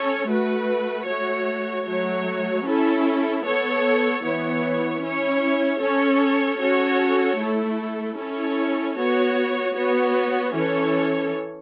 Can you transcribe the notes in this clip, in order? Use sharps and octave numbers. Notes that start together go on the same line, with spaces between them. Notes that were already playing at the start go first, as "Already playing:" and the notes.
Already playing: C#4 A4 C#5
A3 F#4 B4
A3 F#4 C#5
F#3 A3 F#4 C#5
C#4 E4 A4
B3 A4 C#5
E3 B3 E4 C#5
C#4 E4 C#5
C#4 A4 C#5
C#4 F#4 A4 C#5
A3 E4 A4
C#4 E4 A4 C#5
B3 F#4 C#5
B3 F#4 C#5
E3 C#4 A4 C#5